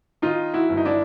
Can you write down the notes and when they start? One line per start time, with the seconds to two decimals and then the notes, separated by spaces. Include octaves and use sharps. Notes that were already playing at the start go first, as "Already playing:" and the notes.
0.22 D#3 D#4 F4
0.54 E4 F#4
0.69 G1
0.77 D#4
0.85 D4 E4